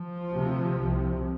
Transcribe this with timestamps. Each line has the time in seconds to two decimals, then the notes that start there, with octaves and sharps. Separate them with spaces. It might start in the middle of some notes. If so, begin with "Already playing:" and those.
Already playing: F3
0.33 D2 C3
0.79 C2 C3